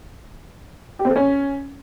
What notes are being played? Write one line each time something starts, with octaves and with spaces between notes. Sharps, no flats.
G4
C4
A4
C#4